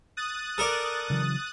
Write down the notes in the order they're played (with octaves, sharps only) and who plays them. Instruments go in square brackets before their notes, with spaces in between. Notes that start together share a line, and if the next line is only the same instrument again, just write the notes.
[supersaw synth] D#6 F#6 A6
[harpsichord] A4 A#4 D5
[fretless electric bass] C#3 E3 F#3